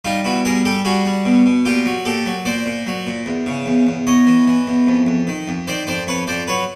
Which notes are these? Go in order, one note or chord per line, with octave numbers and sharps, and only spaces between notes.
G3 D#4 F4
B2 E4 F#4
G3 G#4 A#4
G3 G4 A4
G3 F#4 G#4
G3
B2
B2
A#2 F4 G4
F#3
A#2 G4 A4
F#3
A#2 C5 D5
A#2
F#3
A#2
E2
C#3
E2
E2
E2 C#5 D#5
E3
E3
E2
F2
F2
D#3
F2
D#3 C5 D5
F2 C5 D5
F2 B4 C#5
F2 C5 D5
F#3 B4 C#5